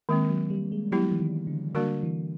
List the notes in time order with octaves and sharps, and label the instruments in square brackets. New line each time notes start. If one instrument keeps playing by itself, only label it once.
[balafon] D#3 G#3 C4 [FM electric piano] A#3
[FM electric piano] F#3
G3
G#3
[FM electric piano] F#3 [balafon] B3 E4 G4
[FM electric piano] E3
D#3
D3
[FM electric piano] D3 [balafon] G3 A#3 D4 F#4 A#4
[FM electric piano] E3